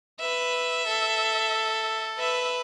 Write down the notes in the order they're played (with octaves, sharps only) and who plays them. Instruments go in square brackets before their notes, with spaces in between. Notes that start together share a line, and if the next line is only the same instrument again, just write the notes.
[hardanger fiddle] B4 [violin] E5
[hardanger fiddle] A4
[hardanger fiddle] B4 [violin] E5